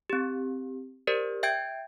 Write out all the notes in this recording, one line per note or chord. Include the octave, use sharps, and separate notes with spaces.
C4 G4
G4 A#4 C5 D5
E5 G5 G6 G#6 D7